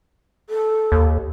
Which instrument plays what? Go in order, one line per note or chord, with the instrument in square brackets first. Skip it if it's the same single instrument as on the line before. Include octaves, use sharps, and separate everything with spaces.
[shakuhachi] A4
[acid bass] D#2